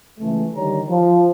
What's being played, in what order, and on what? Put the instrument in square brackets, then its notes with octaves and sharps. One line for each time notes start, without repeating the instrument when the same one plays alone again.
[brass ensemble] C#2 E3 A3
D3 D#3 G3 C#5 A#5
F3